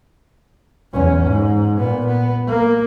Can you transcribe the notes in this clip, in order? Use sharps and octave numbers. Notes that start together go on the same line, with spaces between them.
E2 C#4
G#2
A#2 B3
B3
A#3